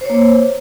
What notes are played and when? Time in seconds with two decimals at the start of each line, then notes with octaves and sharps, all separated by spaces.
0.01 C5
0.05 C#5
0.10 A#3